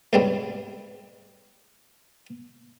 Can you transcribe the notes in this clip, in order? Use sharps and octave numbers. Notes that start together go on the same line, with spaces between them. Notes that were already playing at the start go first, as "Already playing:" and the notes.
D2 G#2 C#3 G3 B3 C4